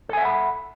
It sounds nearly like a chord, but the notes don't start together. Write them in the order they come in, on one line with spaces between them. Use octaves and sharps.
A4 G#5 E5 F#5 B5